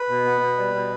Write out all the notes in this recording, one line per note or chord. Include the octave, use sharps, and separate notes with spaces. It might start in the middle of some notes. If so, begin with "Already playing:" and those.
Already playing: B4
B2
B3
B2
G3
B2